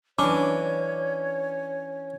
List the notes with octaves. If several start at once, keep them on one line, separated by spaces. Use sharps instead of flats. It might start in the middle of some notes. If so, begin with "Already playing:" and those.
E3 C#4 D4 C#5 D6